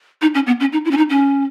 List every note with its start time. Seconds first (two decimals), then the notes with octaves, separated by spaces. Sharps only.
0.22 D#4
0.34 C#4
0.47 B3
0.60 C#4
0.73 D#4
0.85 E4
0.91 C#4
0.97 D#4
1.10 C#4